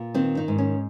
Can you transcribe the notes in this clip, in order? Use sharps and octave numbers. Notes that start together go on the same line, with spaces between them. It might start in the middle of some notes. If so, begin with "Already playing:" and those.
Already playing: A#2
D#3 C4
D#4
G#2
C#4